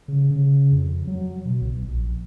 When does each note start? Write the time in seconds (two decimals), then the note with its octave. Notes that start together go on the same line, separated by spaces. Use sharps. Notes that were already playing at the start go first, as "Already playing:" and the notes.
0.08 C#3
0.31 C#3
0.72 F2
1.07 F#3
1.46 B2
1.61 B1
1.82 A#1